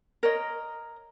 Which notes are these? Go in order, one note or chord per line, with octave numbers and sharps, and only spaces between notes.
A#4 C#5 D#5